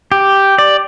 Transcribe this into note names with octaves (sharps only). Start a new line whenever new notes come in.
G4
D5